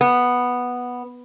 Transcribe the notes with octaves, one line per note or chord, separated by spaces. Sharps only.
B3